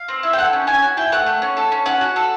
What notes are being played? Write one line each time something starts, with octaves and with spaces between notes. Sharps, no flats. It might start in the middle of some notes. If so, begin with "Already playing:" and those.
Already playing: F5
C4
E4
G5
A4 F#5
C#4
C#4 G#5
F#4
E4 G5
A3 F#5
A3
C#4
A4
C#4
C#4 F#5
F#4
A4